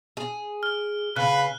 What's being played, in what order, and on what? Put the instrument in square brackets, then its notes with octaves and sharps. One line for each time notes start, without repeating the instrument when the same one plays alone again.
[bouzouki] G#4
[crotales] F6
[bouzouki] C#3 [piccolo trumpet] B4 [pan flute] F5 [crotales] F#6